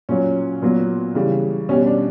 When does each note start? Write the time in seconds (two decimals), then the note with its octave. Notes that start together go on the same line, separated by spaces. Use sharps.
0.09 A#2 F#3 C#4
0.62 A#2 F#3 B3
1.15 C#3 E3 G3
1.69 B2 G3 C#4
1.86 D4